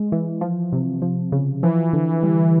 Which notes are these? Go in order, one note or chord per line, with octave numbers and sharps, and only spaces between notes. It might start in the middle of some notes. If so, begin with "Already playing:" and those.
Already playing: G#3
E3
F3
C3
F3
C#3
E3 F3
D3
G3